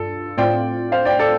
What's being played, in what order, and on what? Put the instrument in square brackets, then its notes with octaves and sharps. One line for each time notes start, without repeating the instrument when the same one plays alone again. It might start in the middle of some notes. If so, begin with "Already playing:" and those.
Already playing: [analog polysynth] G2 D4 F4 [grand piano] A4
[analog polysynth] A2 A3 C4 F4 [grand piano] D5 G5
[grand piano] C5 F5
D5 G5
A4 D5